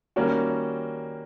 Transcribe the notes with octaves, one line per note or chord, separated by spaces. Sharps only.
D#3 G3 A#3 C#4 F#4